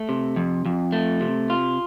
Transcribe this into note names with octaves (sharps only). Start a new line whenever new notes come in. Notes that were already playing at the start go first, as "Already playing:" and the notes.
Already playing: A3
C3
F2
F2
A3
C3
F4